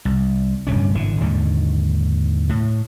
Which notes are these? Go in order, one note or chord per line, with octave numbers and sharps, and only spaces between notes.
C2
D1 G2 C3 C#4
G#1 D3 E3
D#2 G#2 D3 D#3
A2